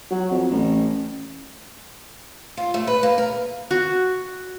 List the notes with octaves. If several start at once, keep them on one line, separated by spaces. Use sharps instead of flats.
F#3
F2
A1
F4
A3
B4
A#3
A#4
F#4